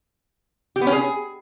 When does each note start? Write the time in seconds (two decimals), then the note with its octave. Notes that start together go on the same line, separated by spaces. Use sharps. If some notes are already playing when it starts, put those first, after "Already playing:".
0.76 G4
0.81 B3
0.87 C#4
0.92 G#4